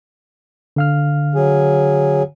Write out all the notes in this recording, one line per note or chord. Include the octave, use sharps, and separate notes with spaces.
D3 F5 F6
F#3 G#4